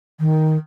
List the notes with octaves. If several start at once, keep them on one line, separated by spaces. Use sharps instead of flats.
D#3